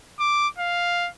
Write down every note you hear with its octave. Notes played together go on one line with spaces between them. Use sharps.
D6
F5